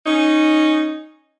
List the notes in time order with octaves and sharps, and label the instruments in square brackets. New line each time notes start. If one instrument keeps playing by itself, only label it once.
[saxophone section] C#4 D#4